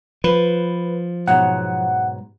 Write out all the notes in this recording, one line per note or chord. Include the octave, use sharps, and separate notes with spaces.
F3 B4
G#2 B2 F#3 F#5